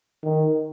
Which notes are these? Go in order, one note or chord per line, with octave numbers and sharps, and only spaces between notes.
D#3